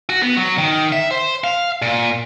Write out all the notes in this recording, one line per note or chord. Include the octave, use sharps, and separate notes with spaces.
F#4
B3
F#3
D#3
E5
C5
F5
A#2